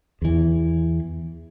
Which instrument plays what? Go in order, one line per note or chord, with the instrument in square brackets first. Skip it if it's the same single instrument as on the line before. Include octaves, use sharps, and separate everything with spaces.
[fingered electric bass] E2 E3